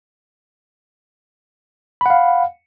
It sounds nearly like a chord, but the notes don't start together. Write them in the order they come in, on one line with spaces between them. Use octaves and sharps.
B5 F#5 F5